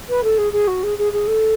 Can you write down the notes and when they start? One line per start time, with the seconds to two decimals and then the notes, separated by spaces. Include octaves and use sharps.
0.09 B4
0.23 A4
0.38 G#4
0.52 G#4
0.67 F#4
0.83 G#4
0.98 G#4
1.12 G#4
1.27 A4